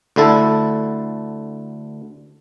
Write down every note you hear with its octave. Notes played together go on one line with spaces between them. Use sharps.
D2 D3 E4 A4